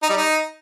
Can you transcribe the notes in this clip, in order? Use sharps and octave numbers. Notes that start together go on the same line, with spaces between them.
D#4
G3
D#4